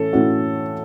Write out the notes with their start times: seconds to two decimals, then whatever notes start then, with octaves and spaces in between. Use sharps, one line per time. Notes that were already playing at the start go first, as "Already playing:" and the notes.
Already playing: A2 E3 C#4 A4
0.13 A2 E3 C#4 F#4